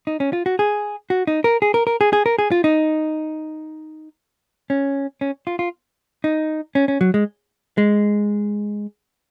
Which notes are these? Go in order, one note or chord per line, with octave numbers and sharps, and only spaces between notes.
D#4
C#4
F4
F#4
G#4
F#4
D#4
A#4
G#4
A#4
A#4
G#4
G#4
A#4
G#4
F4
D#4
C#4
C#4
F4
F4
D#4
C#4
C#4
F#3
G#3
G#3